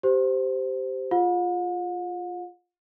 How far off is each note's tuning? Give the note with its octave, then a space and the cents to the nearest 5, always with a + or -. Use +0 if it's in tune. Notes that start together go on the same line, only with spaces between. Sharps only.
G4 -10 C5 -10
F4 +0 G#4 +0 F#5 -45